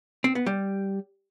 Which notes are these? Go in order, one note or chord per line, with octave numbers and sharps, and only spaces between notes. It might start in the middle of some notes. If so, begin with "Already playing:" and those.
C4
B3
G3